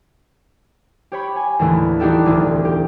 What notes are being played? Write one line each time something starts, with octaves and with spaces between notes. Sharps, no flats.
G4 C#5 B5
G#5
D#2 A2 D3 E3 A3
E3 D4 D#4 F#4 G4 A4
E1 D2 D3 D#4
G4